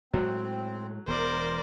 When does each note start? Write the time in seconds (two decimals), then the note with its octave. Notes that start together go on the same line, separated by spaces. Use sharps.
0.14 A2 F#3 G#3 C4
1.07 E1 E3 B3 A#4 C5 D5